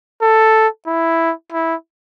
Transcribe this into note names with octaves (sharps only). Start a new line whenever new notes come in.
A4
E4
E4